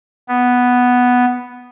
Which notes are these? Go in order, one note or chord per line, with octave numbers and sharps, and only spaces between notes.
B3